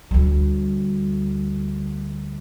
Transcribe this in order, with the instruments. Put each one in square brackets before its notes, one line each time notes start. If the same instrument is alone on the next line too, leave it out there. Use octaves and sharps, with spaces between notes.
[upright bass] D2 G3